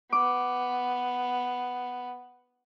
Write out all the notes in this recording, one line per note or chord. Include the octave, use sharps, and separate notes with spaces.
B3 D6